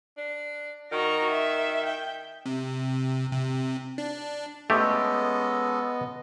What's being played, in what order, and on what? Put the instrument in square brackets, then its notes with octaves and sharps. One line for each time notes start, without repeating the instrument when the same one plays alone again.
[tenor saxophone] D4
[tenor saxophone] D#3 [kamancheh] F#4 A#5
[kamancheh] E5
G5
[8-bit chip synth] C3
C3
D4
[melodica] G#3 C#4 A4 [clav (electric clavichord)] A3 G4 [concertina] B3 D#5